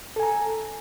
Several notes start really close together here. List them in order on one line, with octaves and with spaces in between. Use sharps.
A4 G#5 A#5